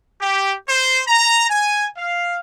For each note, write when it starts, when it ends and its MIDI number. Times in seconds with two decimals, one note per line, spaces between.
0.20 0.54 67
0.68 1.01 72
1.07 1.47 82
1.50 1.86 80
1.97 2.38 77